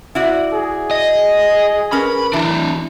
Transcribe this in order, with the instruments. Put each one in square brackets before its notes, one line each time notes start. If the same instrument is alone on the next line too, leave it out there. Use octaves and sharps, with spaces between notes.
[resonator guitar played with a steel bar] E4 F#4 D5
[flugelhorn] G#4
[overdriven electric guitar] D#5
[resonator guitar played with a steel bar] C#4 A#4 B4 [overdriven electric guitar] B5
[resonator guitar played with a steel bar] E3 [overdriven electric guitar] D4 E4